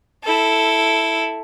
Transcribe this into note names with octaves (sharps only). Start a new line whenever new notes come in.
E4 A4